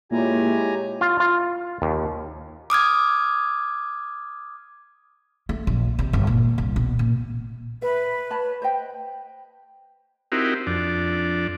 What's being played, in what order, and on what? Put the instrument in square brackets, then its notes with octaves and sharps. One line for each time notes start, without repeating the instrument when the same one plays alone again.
[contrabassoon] A#2 [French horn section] G#3 E4 C#5 [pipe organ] G4 G#5 A#5
[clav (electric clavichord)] F4
F4
D#2
[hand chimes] D6 D#6 F6 G#6
[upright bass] A3
A#1
C3
G1
A#2
C2
B2
A#2
[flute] B4 [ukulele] E5
[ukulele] C#5 A5 B5
C5 D#5 G5
[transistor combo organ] C4 D#4 E4 F#4 G4 A#4
F2 D4